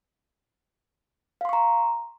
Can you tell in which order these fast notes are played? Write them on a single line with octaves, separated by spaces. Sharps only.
F5 C6 C#6 A#5